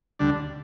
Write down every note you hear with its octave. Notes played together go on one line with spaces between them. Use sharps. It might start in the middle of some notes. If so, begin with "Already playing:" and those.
D2 D3 G3 D4